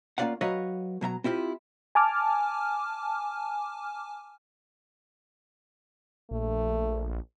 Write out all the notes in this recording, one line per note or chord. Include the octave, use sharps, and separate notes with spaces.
A#3 C#4 F4 D5 F5 F#5
F#3 B4 C#5 D#5 F5
B2 F#3 E5 A#5
C4 E4 F4 G4
G#5 A5 D6 F6
A#1 A3